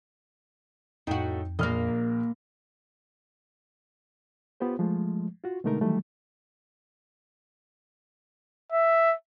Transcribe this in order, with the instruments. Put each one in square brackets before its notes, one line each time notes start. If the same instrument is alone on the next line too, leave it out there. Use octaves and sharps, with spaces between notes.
[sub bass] F2 [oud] A2 F#4 [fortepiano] D#4 G5
[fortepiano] A#1 F6 [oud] A#3 D#5
[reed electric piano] B3 F4 G4 C5
F3 G#3 A3
F4 F#4
B2 D3 G#3 A3 D#4 A#4
D#3 E3 F#3 G3 A3
[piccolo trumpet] E5